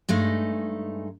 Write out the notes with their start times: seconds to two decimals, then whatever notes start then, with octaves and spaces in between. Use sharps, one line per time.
0.09 G2 G#3 A3 D#4